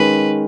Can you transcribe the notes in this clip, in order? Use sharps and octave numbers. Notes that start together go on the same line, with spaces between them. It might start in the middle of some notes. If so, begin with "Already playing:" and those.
Already playing: D#3 G#3 C#4 B4